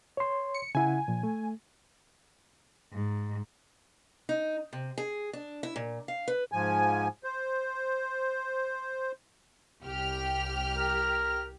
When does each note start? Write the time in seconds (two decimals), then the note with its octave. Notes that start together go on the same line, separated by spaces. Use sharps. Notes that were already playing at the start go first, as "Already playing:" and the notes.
0.17 C#5 C6
0.54 C#7
0.75 C#3 E4 F#5 G#5
1.08 A#2 F3
1.23 A3
2.92 G#2
4.29 D#4
4.73 C3
4.98 G#4
5.33 D4
5.63 E4
5.76 A#2
6.08 F5
6.28 B4
6.52 G#2 F3 G#5
7.24 C5
9.83 C2 G4 F6
10.77 A#4